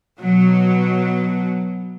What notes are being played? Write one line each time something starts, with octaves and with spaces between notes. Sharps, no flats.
B2 F#3